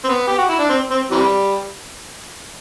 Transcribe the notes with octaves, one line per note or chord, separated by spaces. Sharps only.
C4
B3
G4
F#4
E4
D4
C4
C4
C3 E3 G3